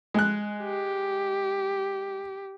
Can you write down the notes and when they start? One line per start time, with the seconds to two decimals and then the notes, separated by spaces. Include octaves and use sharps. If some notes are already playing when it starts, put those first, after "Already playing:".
0.14 G#3 F#6
0.64 G4